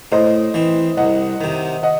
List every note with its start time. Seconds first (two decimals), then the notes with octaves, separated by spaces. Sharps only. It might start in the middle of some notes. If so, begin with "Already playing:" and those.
0.12 A2 C5 D#5
0.54 E3 C4
0.97 C2 D#5 F#5
1.41 C3 D#3
1.83 D#5 F#5